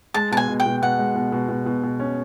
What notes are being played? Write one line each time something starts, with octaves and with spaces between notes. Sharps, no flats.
G#3 A5
B2 A5
G#5
B2
G5
B2
B2 F#5
G#3
B2
B2
B2
B2
B2
C#4